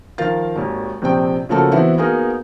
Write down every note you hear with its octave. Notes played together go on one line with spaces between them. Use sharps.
D#3 F3 A#4 F5 A6
G#1 D#2
A#1 C3 C4 G5
C#3 F3 A3 A#3 F#4 A4
E3 B3 C4 E4 F#4
A#3 B3 D#4 F#4 G#4 A#4